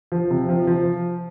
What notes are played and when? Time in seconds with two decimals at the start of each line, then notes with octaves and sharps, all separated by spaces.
0.12 F3
0.30 C3
0.49 F3
0.67 F3